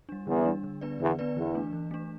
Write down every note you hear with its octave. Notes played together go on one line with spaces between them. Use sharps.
G3 D4
E2 D3
G3 D4
D3
B3 D4 B4 D5
E2 D3
B3 D4 B4 D5
E2 E3
A3 D4
E3
A3 D4